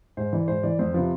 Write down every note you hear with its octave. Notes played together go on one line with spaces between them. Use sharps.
G#2 C5
E3 D5
G#2 C5
E3 D5
F2 C5
C3 F3 B4